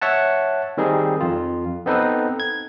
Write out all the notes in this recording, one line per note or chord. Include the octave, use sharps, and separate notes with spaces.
C#5 E5 F#5 A5
D#3 G3 C4 D#4 G#4
F2 F4
B3 C4 D#4 A4 B4
G#6